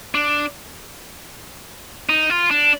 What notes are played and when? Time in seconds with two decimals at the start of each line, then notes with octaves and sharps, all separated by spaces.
0.15 D4
2.09 D#4
2.30 F4
2.51 D4